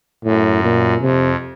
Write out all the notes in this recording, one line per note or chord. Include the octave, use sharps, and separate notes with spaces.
F#2 A2
A#2
F2 C3